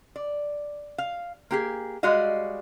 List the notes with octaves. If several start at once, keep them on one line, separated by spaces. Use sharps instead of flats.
D5
F5
A#3 G4 G#4
G3 G#3 F#4 D5 D#5 F5